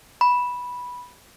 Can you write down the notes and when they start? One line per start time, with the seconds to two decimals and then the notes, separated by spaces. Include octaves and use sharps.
0.21 B5